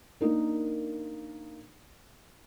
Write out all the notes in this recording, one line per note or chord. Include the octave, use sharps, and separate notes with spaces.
A#3 D4 D#4 A#4